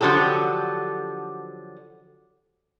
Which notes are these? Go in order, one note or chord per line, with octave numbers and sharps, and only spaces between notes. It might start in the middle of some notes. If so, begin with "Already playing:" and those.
D3 F3 F#3 G4 A4